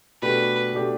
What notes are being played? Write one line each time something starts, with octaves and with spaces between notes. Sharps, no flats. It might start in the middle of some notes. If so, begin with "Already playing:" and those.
B2 A3 D4 G4 B4
B2 A3 D4 G4